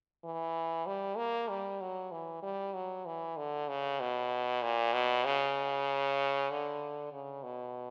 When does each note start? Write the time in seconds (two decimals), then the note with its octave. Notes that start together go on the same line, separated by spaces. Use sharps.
0.24 E3
0.86 G3
1.17 A#3
1.50 G3
1.81 F#3
2.12 E3
2.42 G3
2.74 F#3
3.06 E3
3.37 D3
3.68 C#3
4.00 B2
4.63 A#2
4.93 B2
5.25 C#3
6.50 D3
7.12 C#3
7.43 B2